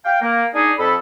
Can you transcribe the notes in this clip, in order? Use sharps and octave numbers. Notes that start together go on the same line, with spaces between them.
F5 G5
A#3
D4 D#4 G#4
F2 A4 B5